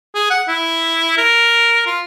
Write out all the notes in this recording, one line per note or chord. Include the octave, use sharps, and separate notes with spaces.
G#4
F#5
E4
A#4
F4